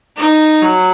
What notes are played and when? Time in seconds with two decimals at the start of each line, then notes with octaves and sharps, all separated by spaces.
0.17 D#4
0.62 F#3